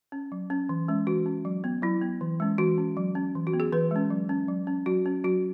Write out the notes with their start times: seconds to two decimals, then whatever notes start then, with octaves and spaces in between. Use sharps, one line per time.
0.12 C#4
0.32 F#3
0.50 C#4
0.69 E3
0.88 G#3 C#4
1.07 E3 F#4
1.26 C#4
1.45 F#3
1.64 B3
1.82 F#3 E4
2.02 B3
2.21 E3
2.40 G#3 C#4
2.58 E3 F#4
2.78 C#4
2.97 F#3
3.15 C#4
3.35 E3
3.47 F#4
3.53 B3
3.60 G#4
3.73 E3 B4
3.91 G#3 C#4
4.10 F#3
4.29 C#4
4.48 F#3
4.67 C#4
4.86 F#3 F#4
5.06 C#4
5.24 F#3 F#4